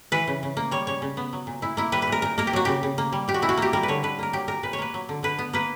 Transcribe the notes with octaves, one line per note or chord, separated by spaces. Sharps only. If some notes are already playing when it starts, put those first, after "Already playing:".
E3 B4
C#3
C#3
A#3
G3 C#5
C#3 C#5
C#3
B3
F#3
A#2
A#2 E4
A#3 E4
G3 B4
B4
A#2 A#4
A#2 A#4
A#3 A#4
G4
F#3 F#4
C#3 G4
C#3
A#3
G3
A#2 G4
F#4
A#2 E4
F#4
A#3 G4
G3 A#4
B4
D3 C#5
D3 B4
A#3 A#4
F#3 G4
A#2 A#4
A#2 B4
C#5
A#3 B4
F#3
D3
D3 B4
B3
A#3 B4